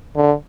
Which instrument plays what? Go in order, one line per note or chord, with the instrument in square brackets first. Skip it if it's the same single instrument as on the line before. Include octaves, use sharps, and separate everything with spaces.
[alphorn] D3